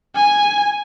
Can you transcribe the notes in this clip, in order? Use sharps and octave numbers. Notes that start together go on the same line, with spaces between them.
G#5